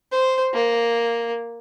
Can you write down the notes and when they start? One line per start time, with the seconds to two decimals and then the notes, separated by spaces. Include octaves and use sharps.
0.12 C5
0.54 A#3